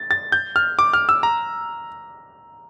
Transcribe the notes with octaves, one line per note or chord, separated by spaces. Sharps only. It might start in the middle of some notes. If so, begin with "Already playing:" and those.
Already playing: A6
A6
G6
F6
D6
F6
E6
A#5